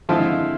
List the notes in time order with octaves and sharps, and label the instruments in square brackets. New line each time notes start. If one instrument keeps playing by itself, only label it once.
[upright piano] D3 G#3 C4 E4 [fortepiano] F3 F4